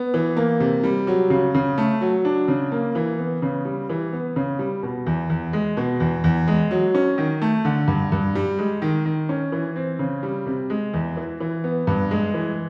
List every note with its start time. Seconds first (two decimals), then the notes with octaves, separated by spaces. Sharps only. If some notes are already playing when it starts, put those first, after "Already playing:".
Already playing: B3
0.14 E3
0.37 A#3
0.60 C3
0.83 G3
1.07 F#3
1.30 C#3
1.55 C#3
1.78 A3
2.01 F#3
2.25 D4
2.48 C#3
2.72 A#3
2.95 E3
3.19 B3
3.42 C#3
3.65 G3
3.89 E3
4.13 B3
4.36 C#3
4.59 G3
4.83 B2
5.06 E2
5.30 E2
5.53 G#3
5.77 B2
6.00 E2
6.24 E2
6.48 G#3
6.71 F#3
6.95 C#4
7.18 D#3
7.42 A3
7.65 D3
7.88 G2
8.12 G2
8.35 G3
8.59 G#3
8.82 D#3
9.05 D#3
9.29 C#4
9.52 E3
9.76 C4
9.99 C#3
10.23 G3
10.46 C3
10.70 G#3
10.94 E2
11.17 E3
11.40 E3
11.64 B3
11.87 G2
12.11 G#3
12.34 E3